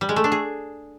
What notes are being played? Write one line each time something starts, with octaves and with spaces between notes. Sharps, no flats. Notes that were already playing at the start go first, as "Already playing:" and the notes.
G3
G#3
A3
D4
G#4